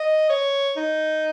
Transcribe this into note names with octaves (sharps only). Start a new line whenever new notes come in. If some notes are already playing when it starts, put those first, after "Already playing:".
Already playing: D#5
C#5
D#4